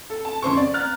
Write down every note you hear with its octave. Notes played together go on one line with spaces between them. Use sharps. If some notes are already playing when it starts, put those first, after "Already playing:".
A4
A5
F2 C#3 C5 C#6
D5
A#5 F6 F#6 A6